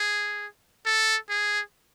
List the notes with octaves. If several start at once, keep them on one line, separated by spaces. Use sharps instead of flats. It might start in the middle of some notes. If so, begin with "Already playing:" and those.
Already playing: G#4
A4
G#4